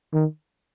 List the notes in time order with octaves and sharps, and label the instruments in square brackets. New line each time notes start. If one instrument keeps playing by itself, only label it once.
[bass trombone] D#3